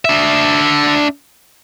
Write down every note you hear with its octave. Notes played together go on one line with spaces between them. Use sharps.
D4 E5